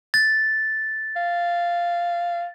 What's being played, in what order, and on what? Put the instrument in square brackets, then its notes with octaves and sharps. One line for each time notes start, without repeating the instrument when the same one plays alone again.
[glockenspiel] A6
[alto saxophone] F5